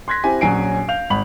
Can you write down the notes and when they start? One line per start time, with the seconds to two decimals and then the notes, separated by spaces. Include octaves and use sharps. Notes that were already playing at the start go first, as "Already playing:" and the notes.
0.08 C6 F#6 G#6 A#6 B6
0.24 C4 E4 G4 G#5
0.41 A#1 F#3 C#4 G#5 C7 D7
0.88 F5 G6 F7
1.10 G#1 B5 F#7